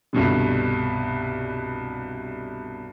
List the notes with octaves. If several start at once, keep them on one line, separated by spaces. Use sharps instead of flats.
C2 G2 B2 D3